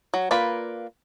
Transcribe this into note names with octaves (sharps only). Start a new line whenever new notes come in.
F#3
A#3 F4 B4 D5 B5